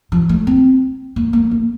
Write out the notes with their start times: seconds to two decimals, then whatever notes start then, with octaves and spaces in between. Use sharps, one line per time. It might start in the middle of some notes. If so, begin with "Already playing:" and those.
0.12 F3
0.29 A3
0.47 C4
1.16 A#3
1.33 A#3
1.51 A#3